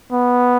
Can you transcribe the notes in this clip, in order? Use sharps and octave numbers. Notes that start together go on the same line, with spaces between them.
B3